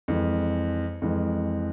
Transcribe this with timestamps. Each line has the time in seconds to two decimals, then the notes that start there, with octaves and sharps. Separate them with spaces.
0.08 F2 E3 G#3
1.02 F2 E3 G#3